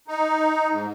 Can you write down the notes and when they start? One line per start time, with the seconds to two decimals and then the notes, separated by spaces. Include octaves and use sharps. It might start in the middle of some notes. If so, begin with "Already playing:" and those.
0.08 D#4
0.71 G#2